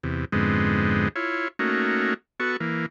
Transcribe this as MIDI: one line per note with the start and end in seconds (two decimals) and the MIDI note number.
0.03 0.25 40
0.03 0.25 48
0.32 1.08 41
0.32 1.08 44
0.32 1.08 50
0.32 1.08 56
0.32 1.08 59
0.32 1.08 60
1.16 1.48 64
1.16 1.48 65
1.16 1.48 73
1.59 2.14 57
1.59 2.14 58
1.59 2.14 61
1.59 2.14 63
1.59 2.14 66
2.40 2.57 59
2.40 2.57 66
2.40 2.57 69
2.40 2.57 85
2.60 2.86 52
2.60 2.86 58